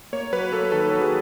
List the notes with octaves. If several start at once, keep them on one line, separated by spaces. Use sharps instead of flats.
A#3 C#5
F#3 B4
A#3 A4
D#3 A4
F#3 A4
G#4